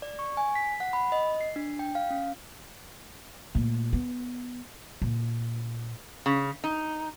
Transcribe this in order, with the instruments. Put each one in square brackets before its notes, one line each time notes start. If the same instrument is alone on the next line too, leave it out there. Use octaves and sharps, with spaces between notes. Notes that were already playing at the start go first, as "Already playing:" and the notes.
[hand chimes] D5
C#6
G#5
B6
F#5
B5
D#5
C7
D4
G5
F5
C#4
[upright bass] A#2 A3
B3
A#2
[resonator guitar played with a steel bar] C#3
D#4